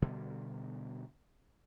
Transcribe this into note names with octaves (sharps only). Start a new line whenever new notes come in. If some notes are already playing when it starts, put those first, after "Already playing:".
B2 D3 G3 B3